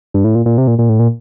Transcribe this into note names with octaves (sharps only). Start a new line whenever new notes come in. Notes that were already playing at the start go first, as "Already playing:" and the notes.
G2
A2
A#2
A#2
C3
A#2
A#2
A2
A#2